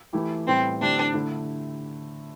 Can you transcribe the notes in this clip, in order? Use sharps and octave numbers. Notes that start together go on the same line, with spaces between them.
E3 A3 E4 G4
A2 G3 B3 C4
D3 A3 C4 D4 E4 G4
D3 A3 E4